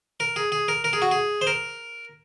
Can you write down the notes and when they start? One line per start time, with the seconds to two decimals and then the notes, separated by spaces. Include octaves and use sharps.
0.20 A#4
0.36 G#4
0.52 G#4
0.68 A#4
0.84 A#4
0.93 G#4
1.02 F#4
1.11 G#4
1.41 C5
1.47 A#4